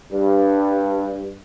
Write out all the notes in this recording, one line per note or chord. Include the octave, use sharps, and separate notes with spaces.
G2